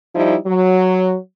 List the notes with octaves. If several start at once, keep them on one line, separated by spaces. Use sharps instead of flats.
F3 G3 D#4 E4
F#3